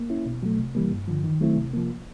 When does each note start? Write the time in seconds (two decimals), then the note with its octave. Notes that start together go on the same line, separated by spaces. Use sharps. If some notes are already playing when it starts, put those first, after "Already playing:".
Already playing: A#3
0.10 C#4 E4
0.26 B2
0.43 F#3 A3
0.59 C3
0.75 E3 G3 A#3
0.91 G2
1.08 D3 F3
1.24 D#3
1.41 F#3 A3 C4 E4
1.57 C3
1.74 F3 A#3